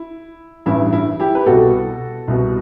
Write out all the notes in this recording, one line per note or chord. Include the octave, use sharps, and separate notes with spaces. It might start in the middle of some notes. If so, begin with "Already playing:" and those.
Already playing: E4
A1 G2 E3 E4
E4
E4 G4
B4
C2 B2 F#4 A4
C2 B2